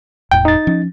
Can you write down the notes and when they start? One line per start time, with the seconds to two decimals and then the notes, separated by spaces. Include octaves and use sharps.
0.32 E1 E2 A2 G5
0.45 D#4 A6
0.67 F3 C#4